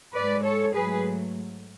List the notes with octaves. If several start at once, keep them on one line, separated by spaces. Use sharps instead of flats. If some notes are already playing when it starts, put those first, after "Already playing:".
G#2 G#3 B4 D5
A4 C#5
G#2 F#3 A3 G#4 B4